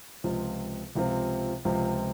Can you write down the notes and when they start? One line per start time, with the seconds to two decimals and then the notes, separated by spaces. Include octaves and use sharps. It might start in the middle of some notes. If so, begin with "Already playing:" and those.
0.24 C#2 C3 F3 C4 F4
0.95 C#2 C3 F3 C4 F4
1.65 C#2 C3 F3 C4 F4